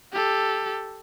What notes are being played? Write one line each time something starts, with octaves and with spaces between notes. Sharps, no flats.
G4 A4